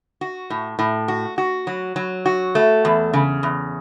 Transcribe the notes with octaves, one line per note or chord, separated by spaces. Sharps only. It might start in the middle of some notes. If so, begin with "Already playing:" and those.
F#4
A2
A2
F#4
F#4
F#3
F#3
F#4
A3
E2
C#3
E2